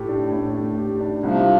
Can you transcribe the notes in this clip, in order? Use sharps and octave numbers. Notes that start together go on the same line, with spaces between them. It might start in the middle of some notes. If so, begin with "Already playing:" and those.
Already playing: A2 A3 G4
D4
A2
A3
G4
D4
C2 C3 F3